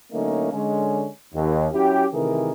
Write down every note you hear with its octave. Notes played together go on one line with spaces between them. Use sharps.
D3 F#3 A3 A#3 C#4 D#4
D3 G#3 C#4
D#2
F#3 C#4 E4 G4
C3 D#3 E3 A3 G#4 A#4